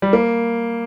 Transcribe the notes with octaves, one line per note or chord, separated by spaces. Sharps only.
G3
A#3